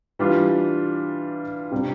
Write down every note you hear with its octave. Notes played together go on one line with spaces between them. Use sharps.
E3 G3 D4 F4
C3 G3 D4 G4